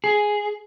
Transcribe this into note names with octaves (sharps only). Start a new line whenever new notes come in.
G#4